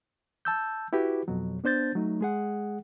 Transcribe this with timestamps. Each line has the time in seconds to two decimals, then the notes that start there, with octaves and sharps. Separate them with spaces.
0.45 A5 E6 G6
0.93 E4 F#4 G4 B4
1.28 F2 B2 F#3
1.64 B3 D4 C5 G6 A6
1.95 F#3 A3 D#4
2.21 G#3 G#4 F#5